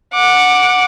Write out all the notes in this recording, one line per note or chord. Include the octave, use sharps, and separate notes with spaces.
F#5 D6